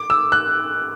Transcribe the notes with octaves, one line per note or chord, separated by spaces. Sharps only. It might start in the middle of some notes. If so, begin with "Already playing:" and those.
Already playing: D6
E6
F#6